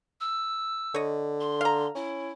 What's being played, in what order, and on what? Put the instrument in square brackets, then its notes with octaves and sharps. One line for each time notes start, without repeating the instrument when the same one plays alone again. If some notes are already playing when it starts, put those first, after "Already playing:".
[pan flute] E6
[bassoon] D3 [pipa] C#5 D#5
[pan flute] C6
[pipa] F5 A#5
[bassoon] C#4 [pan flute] E4